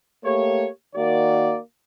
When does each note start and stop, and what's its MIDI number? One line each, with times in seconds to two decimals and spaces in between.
0.24 0.68 57
0.24 0.68 58
0.24 0.68 67
0.24 0.68 73
0.96 1.58 51
0.96 1.58 58
0.96 1.58 66
0.96 1.58 74